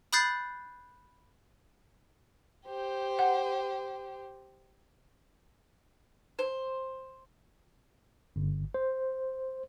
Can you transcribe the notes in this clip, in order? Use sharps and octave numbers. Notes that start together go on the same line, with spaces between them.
B5 D#6 F#6 G6 A6 C7
G4 C5
F#5
C5
G1
C5